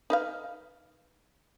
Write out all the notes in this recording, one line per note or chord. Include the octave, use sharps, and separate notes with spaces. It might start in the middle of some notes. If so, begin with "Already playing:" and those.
D#4 B4 F5